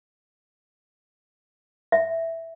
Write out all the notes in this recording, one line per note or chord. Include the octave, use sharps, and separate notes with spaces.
E5